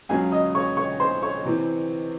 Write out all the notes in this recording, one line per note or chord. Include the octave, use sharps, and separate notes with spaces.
C#2 C#3 F#3 C#4 G#4 G#5
D#5 D#6
C#5 C#6
C#5 C#6
C5 C6
C#5 C#6
C3 E3 C4